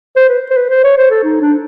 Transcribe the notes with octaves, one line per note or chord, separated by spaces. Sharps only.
C5
B4
C5
B4
C5
C#5
C5
A4
D#4
D4